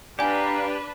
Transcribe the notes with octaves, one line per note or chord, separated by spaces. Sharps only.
D4 G4 B4 D5 F5 G#5 A#5